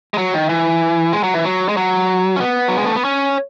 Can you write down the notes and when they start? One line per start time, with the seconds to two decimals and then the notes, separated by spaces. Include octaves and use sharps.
0.14 G#3
0.18 F#3
0.34 D#3
0.49 E3
1.13 G#3
1.24 F#3
1.34 E3
1.45 F#3
1.69 G#3
1.77 F#3
2.36 C#4
2.41 B3
2.68 F#3
2.78 G#3
2.86 A3
2.95 B3
3.04 C#4